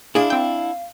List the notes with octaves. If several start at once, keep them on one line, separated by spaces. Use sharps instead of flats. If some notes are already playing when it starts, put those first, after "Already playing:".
D4 E4 G#4 F5
C4 G5